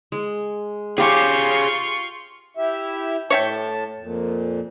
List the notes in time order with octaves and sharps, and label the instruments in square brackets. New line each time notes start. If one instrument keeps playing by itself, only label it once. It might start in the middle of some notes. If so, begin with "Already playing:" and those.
[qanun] G#3
[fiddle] F4 C#6 [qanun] G4 [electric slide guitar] G#4 F5 G#5
[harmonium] E4 G4 E5
[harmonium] A2 A5 [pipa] C#5 E5 G5
[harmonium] F2 A#2